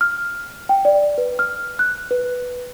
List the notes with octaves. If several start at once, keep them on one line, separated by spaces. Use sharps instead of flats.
F6
G5
D5
B4
F6
F#6
B4